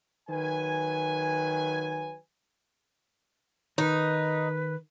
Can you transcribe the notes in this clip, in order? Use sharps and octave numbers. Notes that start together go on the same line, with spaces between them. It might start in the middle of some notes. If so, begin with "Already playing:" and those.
D#3 F#3 B4 G#5
D#3 D#4 B4